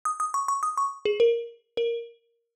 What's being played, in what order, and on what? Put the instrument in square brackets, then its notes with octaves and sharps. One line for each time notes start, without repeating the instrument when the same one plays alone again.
[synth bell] D#6
D#6
C#6
C#6
D#6
C#6
G#4
A#4
A#4